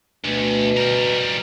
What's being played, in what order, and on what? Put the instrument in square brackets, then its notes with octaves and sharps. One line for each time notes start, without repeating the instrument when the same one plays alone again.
[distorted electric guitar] D2 [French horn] B2
[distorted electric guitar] G3 A#4